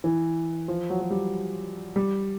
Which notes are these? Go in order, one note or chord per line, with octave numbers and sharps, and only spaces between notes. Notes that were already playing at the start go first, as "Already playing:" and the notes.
E3
F3
F#3
F#3
G3
G3